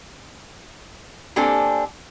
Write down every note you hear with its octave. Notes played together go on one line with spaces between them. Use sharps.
A#3 C4 D4 G4 A4 G#5